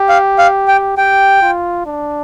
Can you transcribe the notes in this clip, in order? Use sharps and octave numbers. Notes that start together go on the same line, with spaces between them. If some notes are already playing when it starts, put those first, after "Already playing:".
Already playing: G4
F5
F5
G5
G4 G5
F4
D4